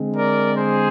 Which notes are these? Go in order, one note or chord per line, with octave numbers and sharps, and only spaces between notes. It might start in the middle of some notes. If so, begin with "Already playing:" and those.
Already playing: D3 G#3 C4
A#4 D5
G#4 C5